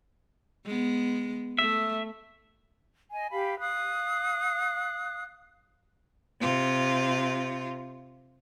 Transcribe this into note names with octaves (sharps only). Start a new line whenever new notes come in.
G#3 B3
A3 E5
D#5 G#5
G4 F5 B5
F5 D#6 F#6
C3 F4